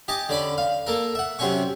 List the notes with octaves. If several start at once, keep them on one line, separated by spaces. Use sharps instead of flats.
G4 D#5 G#5 A5
D3 C#4 D5 B5
F5
A#3 A4 A#4
E5 F#5
C3 F#3 C4 C#4 G#5 C#6